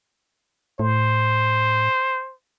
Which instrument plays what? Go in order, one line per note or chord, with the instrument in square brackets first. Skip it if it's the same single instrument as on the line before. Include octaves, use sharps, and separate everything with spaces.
[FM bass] A2 [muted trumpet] C5